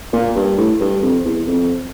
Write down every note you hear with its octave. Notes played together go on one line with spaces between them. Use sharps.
A#2
G2
A2
G2
F2
E2
F2